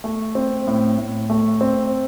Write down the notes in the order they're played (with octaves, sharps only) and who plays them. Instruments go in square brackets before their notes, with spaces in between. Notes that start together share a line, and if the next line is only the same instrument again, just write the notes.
[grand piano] A3
C4
A2
A2
A3
C4